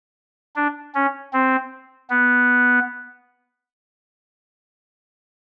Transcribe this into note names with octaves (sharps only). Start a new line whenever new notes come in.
D4
C#4
C4
B3